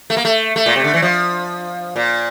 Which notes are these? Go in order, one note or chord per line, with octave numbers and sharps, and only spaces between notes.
A3
A#3
A3
A3
A#2
C3
D3
E3
F3
A#2